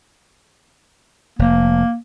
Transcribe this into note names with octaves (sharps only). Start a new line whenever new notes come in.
F1 A#3